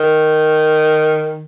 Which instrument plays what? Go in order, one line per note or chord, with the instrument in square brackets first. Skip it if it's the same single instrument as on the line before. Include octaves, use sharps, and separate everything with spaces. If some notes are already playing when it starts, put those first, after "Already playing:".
Already playing: [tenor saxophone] D#3